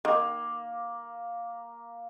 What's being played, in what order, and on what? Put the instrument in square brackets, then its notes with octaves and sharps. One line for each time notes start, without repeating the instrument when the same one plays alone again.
[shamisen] D#3 [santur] A#3